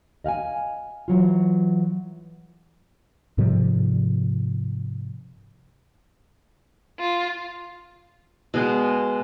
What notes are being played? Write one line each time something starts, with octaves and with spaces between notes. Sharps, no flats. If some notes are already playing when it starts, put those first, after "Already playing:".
D#5 F5 F#5 G#5
E3 F#3 F4
G#2 C3 F3 G3
F4
B2 G#3 C6